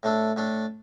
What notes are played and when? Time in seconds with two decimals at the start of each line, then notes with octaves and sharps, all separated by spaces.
0.03 A2 A3 D4 A4
0.36 A2 A3 D4 A4